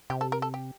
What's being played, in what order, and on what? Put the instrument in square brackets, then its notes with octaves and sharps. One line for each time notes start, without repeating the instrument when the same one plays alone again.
[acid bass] C3 [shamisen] G4
[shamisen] A4
A#4
A4
G4